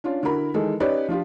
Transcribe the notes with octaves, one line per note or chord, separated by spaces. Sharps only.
C#4 D4 F4
D3 E4 F#4 A#4 B5
D#3 E3 G#3 A4
C#4 D#4 G4 B4 C#5 D5
F3 D4 F4 G4